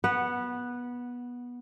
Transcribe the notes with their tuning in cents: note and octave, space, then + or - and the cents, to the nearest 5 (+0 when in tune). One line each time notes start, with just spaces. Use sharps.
B3 -15 F#5 +0